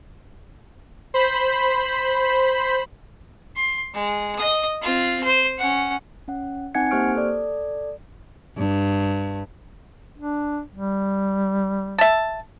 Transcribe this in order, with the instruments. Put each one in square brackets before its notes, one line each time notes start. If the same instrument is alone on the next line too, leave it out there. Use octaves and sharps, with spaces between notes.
[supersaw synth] C5 B5
[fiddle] C6
G#3
D#5 D#6
C4 F4
C5
C#4 F#5
[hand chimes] C#4 F#5
C4 D#4 F#5 G#5 G#6 C#7
A#3 G4 C5 C#6 F6 D7
A4 D5
[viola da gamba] G2
[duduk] D4
G3
[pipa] E5 A5